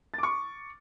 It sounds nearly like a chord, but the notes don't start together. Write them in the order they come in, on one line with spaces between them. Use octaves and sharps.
A6 D6 C#6